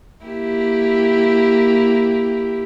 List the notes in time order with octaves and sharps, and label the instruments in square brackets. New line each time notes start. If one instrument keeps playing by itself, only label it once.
[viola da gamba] A#3 E4 G4